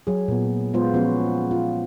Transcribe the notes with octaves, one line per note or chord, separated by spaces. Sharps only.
F#3 G#4
A#2 B3
G#3 B3 F4 C5
F3 B3 C#4 F#4
F4